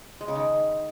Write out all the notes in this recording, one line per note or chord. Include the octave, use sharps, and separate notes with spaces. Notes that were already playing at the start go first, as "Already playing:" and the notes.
G#3
C#3
D#3